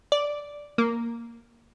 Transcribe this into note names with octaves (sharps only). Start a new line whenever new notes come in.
D5
A#3